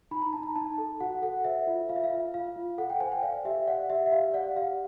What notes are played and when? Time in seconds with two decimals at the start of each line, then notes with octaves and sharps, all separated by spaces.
0.11 D#4 B5
0.22 A#5
0.33 D#4 A5
0.43 A#5
0.56 D#4 A5
0.78 A4
1.00 F#4 F#5
1.22 A4 F#5
1.44 C5 E5
1.67 F4
1.89 F4 F5
1.96 E5
2.04 F5
2.11 F4
2.34 F4 F5
2.56 F4
2.78 A4 F#5
2.90 G5
3.00 C5 G#5
3.12 G5
3.22 D5 F5
3.45 G4 E5
3.67 D5 F#5
3.90 G4 E5
4.06 E5
4.12 G4 F5
4.34 D5 F#5
4.56 G4 F5